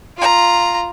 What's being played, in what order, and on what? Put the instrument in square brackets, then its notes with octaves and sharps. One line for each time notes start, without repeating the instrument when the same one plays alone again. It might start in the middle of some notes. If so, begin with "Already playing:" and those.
[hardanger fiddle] F4 A#5